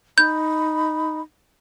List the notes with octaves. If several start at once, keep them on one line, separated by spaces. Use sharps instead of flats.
D#4 B5 G6